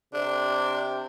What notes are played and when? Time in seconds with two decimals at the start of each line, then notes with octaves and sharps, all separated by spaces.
0.14 C3 D4